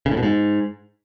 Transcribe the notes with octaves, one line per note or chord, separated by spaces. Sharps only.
C#3
A2
B2
G#2